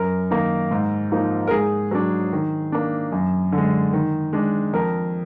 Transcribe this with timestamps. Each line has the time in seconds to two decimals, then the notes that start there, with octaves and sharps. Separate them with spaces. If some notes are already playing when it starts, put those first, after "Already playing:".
Already playing: F#2 A#4
0.31 D#3 A#3 D#4
0.71 G#2
1.12 F3 A#3 D#4
1.47 A#4
1.51 G#2 G#4
1.91 F#3 D4
2.33 D#3
2.72 A#3 D4
3.12 F#2
3.52 D3
3.58 G#3
3.93 D#3
4.33 G#3 D4
4.74 F2 A#4